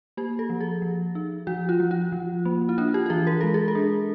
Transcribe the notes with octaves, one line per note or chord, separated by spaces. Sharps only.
A#3 G4
A4
F3
G#4
F3
D#4
F3 F#4
F4
F3
F4
F3
A#3
E4
D4 F4
G4
G4
E3 G#4
A#4
G#3 A4
G#4
A4
D4